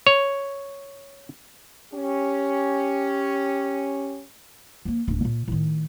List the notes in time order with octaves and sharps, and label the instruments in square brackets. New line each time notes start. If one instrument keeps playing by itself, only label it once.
[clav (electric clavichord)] C#5
[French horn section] C#4 G4
[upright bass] F3 A#3
D1 D4
A#2
A2 D#3